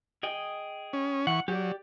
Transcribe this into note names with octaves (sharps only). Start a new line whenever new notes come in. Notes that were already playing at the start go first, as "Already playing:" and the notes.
G#4 D#5 G5
C#4
E3 F#5 C#6
F#3 G4 D5